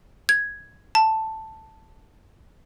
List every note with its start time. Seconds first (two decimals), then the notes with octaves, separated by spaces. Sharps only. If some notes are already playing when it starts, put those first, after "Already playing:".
0.29 G#6
0.95 A5